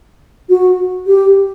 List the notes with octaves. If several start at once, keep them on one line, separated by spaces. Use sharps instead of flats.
F#4
G4